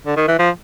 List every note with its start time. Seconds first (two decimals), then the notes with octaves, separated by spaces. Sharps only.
0.06 D3
0.17 D#3
0.28 E3
0.39 F3